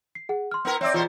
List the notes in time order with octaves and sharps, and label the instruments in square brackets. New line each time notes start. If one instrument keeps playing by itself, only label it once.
[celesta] C7
G#4 F#5
C6 F6
[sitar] B3 E4 A#4
[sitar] C4 D5 [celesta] C#5 E5 E6
[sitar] E2 B2 C5 [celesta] F4